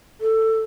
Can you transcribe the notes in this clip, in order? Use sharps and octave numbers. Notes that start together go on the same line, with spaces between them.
A4